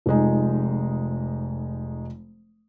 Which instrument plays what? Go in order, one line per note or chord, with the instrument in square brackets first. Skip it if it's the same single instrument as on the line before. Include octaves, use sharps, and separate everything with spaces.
[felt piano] F1 F2 G#3 D#4